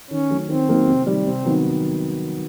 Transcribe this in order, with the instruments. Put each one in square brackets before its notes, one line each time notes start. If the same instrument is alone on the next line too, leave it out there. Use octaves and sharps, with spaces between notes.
[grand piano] D#3 [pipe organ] C#4
[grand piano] F#3 A3
[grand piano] D#3 [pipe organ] C4
[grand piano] F#3 A#3 D#4
C3
D#3 G3
[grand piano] C3 [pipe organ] C4
[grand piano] D#3 F#3 B3